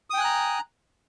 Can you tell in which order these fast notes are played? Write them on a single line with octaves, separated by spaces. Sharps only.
D#6 G5 G#5 F#6 A#5